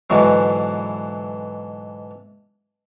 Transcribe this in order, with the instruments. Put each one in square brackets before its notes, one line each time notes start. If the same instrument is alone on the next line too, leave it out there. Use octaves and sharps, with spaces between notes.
[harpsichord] G#2 B2 D3 E3 F#3